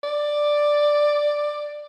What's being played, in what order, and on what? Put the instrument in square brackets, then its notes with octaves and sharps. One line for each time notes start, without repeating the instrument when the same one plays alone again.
[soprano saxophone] D5